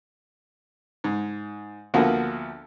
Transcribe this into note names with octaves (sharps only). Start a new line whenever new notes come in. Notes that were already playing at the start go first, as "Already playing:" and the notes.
G#2
D2 F3 A#3 B3 F#4